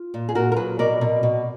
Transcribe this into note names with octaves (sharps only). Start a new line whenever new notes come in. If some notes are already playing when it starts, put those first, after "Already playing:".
Already playing: F4
A#2
G#4
A#2 F#4 A#4
A#4
F#3 G#4 B4
B2 A#4 D5
B2
B2